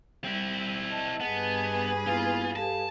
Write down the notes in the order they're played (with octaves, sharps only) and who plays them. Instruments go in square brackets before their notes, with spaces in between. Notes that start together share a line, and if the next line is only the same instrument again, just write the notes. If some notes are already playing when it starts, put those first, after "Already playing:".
[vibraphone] G3 [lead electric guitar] C4 E4
[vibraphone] D#5 A5
[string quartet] G2 G#4 B4 [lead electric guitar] B3
[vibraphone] A#3 B3 E4 [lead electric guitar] F4
[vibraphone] G4 A4 F5 [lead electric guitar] A5